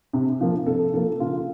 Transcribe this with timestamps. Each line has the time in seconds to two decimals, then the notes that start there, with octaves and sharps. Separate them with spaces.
0.13 C3
0.41 F3 A#3
0.66 C3 A4
0.93 F3 A#3 A4
1.20 C#3 F4